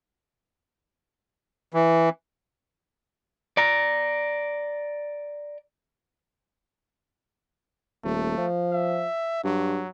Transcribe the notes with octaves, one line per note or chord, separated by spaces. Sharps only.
E3
D5 A#5
D#1 A3
F3
E5
G2 F#3